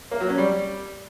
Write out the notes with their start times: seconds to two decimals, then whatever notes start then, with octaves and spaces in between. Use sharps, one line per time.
0.11 A#3
0.20 F#3
0.29 C#4
0.38 G3